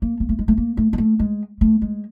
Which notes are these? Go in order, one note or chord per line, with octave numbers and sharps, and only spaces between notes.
A#3
A#3
A3
G#3
A3
A#3
A3
G#3
A3
G#3
A3
G#3